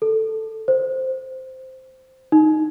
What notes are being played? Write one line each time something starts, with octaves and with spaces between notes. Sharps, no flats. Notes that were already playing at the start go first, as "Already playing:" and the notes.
A4
C5
D#4